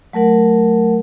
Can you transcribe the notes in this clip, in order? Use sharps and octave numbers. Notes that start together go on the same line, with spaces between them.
F#3 A3 A#4 F#5